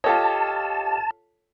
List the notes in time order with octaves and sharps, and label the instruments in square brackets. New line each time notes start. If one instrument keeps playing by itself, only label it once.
[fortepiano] F4 A4 C#5 [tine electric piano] G4 D#5 [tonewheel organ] A5